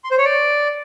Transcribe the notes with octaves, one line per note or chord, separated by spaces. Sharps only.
C6
C5
C#5
D5